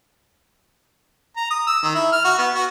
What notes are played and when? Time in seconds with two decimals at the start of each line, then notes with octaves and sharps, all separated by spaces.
1.37 A#5
1.51 D#6
1.67 E6
1.83 D#3
1.95 E4
2.13 F6
2.25 F#4
2.39 B3
2.55 F#4